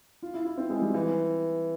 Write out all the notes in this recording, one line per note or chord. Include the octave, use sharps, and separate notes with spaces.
F4
E4
E4
C4
G#3
G3
E3